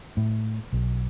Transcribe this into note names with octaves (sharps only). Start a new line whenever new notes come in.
A2
B1